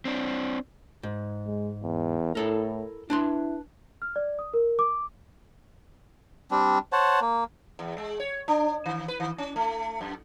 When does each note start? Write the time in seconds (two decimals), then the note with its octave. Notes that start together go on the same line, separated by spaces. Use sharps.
0.05 C4 D4
1.03 G#2
1.46 G#3
1.83 E2
2.35 A2 E4 A4 A#4
3.10 D4 E4 B4 C6
4.02 F6
4.16 D5
4.39 D#6
4.54 A#4
4.79 D6
6.51 G3 C4 D4
6.92 C5 C#5 F#5 A5
7.21 A#3
7.79 E2
7.98 G#3
8.20 C#5
8.48 D4
8.86 D#3
9.08 B4
9.20 D#3
9.38 C#4
9.56 A3
10.01 F#2